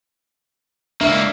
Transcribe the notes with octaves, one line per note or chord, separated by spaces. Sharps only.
C#2 A#3 D4 E5